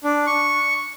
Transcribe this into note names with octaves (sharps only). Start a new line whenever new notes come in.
D4
C#6